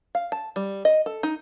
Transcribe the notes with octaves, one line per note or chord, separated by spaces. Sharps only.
F5
A5
G3
D#5
A4
D#4